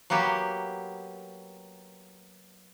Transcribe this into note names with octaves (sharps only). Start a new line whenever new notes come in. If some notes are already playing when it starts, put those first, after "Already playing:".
F#3 A#3 B3 G4